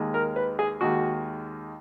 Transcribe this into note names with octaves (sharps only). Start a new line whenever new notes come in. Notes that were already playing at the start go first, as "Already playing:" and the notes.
Already playing: D#2 D#3 G#3
A#4
B4
G#4
D#2 D#3 G#3 F#4